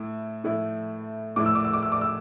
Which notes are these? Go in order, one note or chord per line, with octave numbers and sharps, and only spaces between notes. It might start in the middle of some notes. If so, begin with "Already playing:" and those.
Already playing: A2 E4
A2 A3 E4
A2 A3 E4 D6
E6
D6
E6
D6
E6
D6
E6